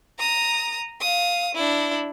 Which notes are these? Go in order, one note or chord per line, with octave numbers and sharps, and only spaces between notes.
A#5 D#6
F5 D#6
D4 E4